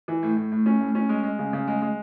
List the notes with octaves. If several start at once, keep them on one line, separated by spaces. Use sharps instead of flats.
E3
A2
A2
A2
C#4
A2
C#4
G#3
G#3
C#3
C#3
G#3
G#3